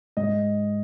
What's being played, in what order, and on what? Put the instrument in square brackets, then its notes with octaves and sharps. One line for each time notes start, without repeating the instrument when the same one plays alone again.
[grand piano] G#2 D#5